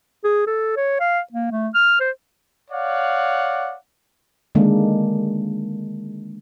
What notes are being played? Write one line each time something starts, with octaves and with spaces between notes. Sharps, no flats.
G#4
A4
C#5
F5
A#3
A3
F6
C5
C#5 D5 F5 F#5
D3 D#3 G#3 A#3 D4